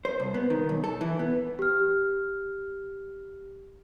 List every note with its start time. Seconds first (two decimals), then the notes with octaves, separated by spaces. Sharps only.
0.05 C5
0.20 C2
0.34 B3
0.50 D#3
0.69 B1
0.84 A4
1.01 E3
1.19 B3
1.59 G4 F6